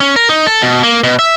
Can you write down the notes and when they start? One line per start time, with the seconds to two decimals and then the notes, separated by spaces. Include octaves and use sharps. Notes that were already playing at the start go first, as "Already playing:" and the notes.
0.01 C#4
0.16 A#4
0.29 D#4
0.47 A4
0.61 B2
0.83 A#3
1.04 B2
1.19 E5